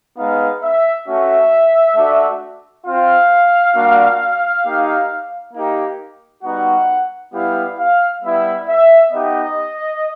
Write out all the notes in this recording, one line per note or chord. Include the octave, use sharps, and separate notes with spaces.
G#3 B3 D#4 F5
E5
A3 C#4 F#4 E5
A3 D4 F#4
C4 F4 F5
G3 A#3 D4 F#4
A#3 D#4 G4
A#3 D#4 G4
G3 B3 D#4 F#4 F#5
G3 B3 E4 G4 F5
F5
G3 B3 E4 E5
E5
B3 D#4 G4 D#5